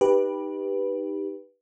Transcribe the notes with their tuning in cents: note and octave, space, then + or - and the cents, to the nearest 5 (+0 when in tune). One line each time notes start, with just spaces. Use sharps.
D#4 -5 G4 +10 B4 -10